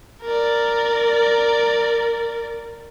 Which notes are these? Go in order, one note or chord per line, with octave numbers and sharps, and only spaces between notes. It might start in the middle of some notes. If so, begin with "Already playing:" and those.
A#4 D5